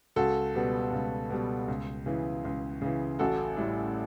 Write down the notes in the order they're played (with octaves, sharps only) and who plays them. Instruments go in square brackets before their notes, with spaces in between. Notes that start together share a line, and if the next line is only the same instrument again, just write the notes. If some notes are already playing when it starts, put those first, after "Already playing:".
[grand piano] C#2 F#4 A4
B2 G3 B3
C#2
B2 G3 B3
C#2
C#3 E3
C#2
C#3 E3
A1 F#4 A4
A2 G3